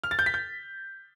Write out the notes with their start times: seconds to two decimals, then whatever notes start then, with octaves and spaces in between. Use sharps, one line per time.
0.04 F6
0.11 A6
0.19 G6
0.26 B6
0.34 G6